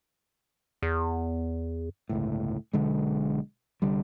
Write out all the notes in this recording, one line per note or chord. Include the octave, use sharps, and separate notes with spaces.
E2
G1 C#2 A2
B1 D3 G#3
C2 D3 G3